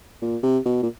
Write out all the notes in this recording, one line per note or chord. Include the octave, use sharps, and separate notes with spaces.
A#2
C3
B2
A#2